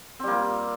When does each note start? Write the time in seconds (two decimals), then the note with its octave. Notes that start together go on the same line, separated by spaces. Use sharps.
0.20 C4
0.23 G3
0.27 A#3
0.31 F4